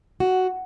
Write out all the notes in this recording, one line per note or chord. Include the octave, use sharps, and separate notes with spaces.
F#4